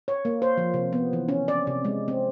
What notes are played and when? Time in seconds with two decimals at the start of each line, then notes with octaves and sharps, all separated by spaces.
0.08 C#5
0.25 A#3
0.42 C5
0.57 F3
0.74 C3
0.93 B3
1.13 E3
1.29 C#4
1.48 D5
1.67 C3
1.85 G#3
2.08 C4